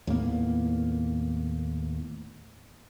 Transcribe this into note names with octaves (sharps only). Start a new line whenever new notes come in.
D#2 A2 A#3 B3